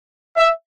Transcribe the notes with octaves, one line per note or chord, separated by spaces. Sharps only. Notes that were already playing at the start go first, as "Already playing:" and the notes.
E5